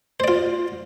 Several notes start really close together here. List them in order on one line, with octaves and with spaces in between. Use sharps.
C5 D5 F4